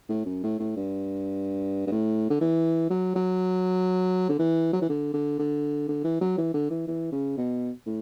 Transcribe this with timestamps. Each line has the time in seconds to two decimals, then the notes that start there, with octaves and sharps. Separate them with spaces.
0.09 A2
0.26 F#2
0.44 A2
0.59 A2
0.77 G2
1.87 G2
1.92 A2
2.30 D3
2.41 E3
2.90 F#3
3.16 F#3
4.29 D3
4.39 E3
4.73 F#3
4.81 E3
4.89 D3
5.14 D3
5.39 D3
5.88 D3
6.04 E3
6.21 F#3
6.38 E3
6.54 D3
6.70 E3
6.88 E3
7.12 C#3
7.37 B2
7.86 A2